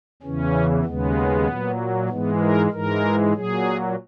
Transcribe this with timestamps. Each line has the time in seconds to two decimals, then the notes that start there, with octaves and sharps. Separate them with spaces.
0.22 E2 C#3 E3 C#4
0.84 D#2 C#3 G#3 B3
1.47 A#2 F#3
2.09 G#2 E3 G#3 B3
2.40 A#4
2.71 G#2 E3 G#3 A#4
3.33 A#2 F#3 G#4